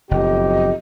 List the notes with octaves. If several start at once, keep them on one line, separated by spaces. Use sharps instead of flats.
F#1 B1 F2 G4 D#5